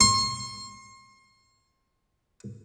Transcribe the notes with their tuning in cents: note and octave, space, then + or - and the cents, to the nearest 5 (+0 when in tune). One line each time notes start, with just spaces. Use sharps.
C6 +35